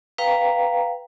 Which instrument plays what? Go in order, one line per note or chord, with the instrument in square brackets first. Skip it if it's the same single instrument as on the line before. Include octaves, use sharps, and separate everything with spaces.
[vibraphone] B4 F5 G5 A#5